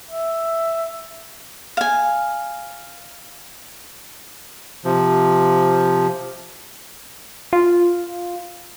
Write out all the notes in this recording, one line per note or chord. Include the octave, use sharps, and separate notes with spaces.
E5
F5 G#5
C3 F3
F4